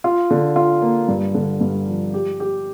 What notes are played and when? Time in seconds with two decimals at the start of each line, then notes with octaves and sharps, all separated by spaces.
0.04 F4
0.30 D3
0.56 F4
0.82 A#3
1.08 G2
1.34 D3
1.61 G2
1.88 F3
2.14 G4
2.40 G4